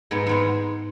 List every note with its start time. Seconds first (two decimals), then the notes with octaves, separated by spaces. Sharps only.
0.11 G#2 G#3 B3
0.27 G#2 G#3 B3